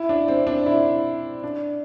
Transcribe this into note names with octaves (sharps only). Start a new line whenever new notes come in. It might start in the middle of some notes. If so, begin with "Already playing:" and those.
Already playing: E4
D4
C4
D4
E4
D4